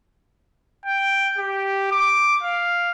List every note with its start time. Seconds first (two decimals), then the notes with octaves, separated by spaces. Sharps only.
0.86 G5
1.38 G4
1.91 D6
2.43 F5